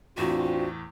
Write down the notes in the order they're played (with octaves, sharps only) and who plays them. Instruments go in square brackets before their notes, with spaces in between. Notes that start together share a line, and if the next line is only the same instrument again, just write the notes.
[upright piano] E2 A2 [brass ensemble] C4 D4 F4 [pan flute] F#4